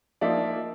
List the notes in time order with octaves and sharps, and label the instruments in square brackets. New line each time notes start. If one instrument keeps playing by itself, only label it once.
[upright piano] F3 A#3 D#4 D5 E5